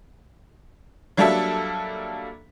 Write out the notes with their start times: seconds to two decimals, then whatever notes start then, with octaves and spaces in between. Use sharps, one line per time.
1.17 F#3 G3 A#3 D4 A4 E5